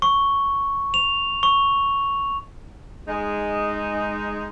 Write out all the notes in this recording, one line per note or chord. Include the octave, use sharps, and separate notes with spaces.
C#6
F7
C#6
G#3 D#4